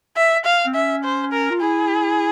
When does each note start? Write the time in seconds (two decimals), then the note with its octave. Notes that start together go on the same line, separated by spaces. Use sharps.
0.17 E5
0.45 F5
0.66 C4
0.75 C#4 E5
1.04 C5
1.32 A#4
1.50 F4
1.61 E4 G#4